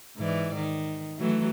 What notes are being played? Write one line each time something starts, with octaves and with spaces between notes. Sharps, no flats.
G#2 E3 D5
D#3
E3 F#3 A3